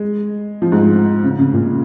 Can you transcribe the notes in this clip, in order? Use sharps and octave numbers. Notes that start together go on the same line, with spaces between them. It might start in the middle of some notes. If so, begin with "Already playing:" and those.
Already playing: G#3
F3
G#2
C#3
C#3
A#2